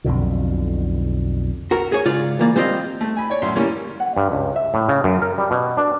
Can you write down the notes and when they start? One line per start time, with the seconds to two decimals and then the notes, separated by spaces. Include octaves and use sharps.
0.04 B1 F2 B2 D3
1.71 F#4 A#4
1.92 G#4 C#5
2.05 G#2 C#3 F4 D5
2.39 E3 A#3 D5
2.56 G3 C4 F4 D#5
3.01 A3
3.17 G#5 B5
3.30 C#5 D5
3.42 A1 F#2 C6
3.56 E3 G3 A#3 C#4
4.00 F#5
4.17 G2
4.32 C#2
4.56 E5
4.74 A2
4.89 C#3
5.04 F#2
5.22 A#4
5.38 G3
5.51 B2
5.77 D4